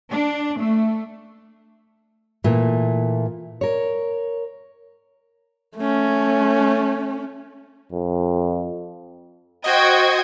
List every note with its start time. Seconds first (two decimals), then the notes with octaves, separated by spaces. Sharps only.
0.10 D4
0.57 A3
2.44 A#2 E3 A3
3.61 A#4 C#5
5.77 A3 C#4
7.92 F2
9.64 F#4 C5 D#5 G5 G#6